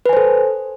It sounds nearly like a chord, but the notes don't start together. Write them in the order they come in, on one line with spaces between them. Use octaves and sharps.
B4 G#5 C5 A4